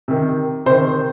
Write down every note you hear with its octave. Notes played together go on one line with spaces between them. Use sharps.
C3 D#3
C3 D#3 C5